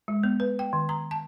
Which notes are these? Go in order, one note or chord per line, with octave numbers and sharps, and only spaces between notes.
G#3
B3
B4
G5
D#3
A#5
A5